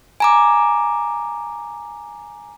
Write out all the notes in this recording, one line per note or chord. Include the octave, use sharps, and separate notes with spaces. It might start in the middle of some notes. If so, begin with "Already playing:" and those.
G#5 A#5 D6